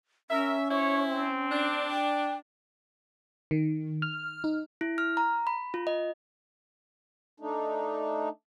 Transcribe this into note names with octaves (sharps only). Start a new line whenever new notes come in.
C#4 A#4 E5
E4 C5 C#5 E5
C4
D4
G5
D#3
F6
D#4
E4
F6
A#5
B5
F4
D#5
A3 D4 D#4